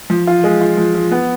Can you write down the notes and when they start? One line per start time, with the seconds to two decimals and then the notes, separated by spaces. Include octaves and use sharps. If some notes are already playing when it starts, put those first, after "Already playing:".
0.10 F3
0.27 F4
0.44 G#3
0.61 F4
0.77 F3
0.94 F3
1.12 B3